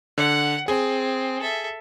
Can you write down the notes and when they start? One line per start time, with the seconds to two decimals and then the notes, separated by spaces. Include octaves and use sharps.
0.18 D3 F#5
0.68 C4 G#4
1.42 A4 E5